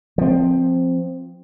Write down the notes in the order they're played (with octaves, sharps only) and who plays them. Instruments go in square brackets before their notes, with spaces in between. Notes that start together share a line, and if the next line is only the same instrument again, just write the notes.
[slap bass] F3 C4